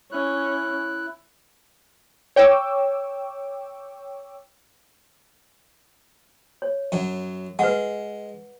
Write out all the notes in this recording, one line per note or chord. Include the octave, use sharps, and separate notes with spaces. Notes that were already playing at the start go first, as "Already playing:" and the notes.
C#4 E4 F#6
C#5 G5 C#6 D6 E6
C#5
F#2 F#3
G#3 B4 F#5